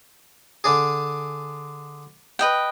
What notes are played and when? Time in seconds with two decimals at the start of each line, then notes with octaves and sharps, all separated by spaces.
0.64 D3 D4 G#4
2.39 B4 D#5 G5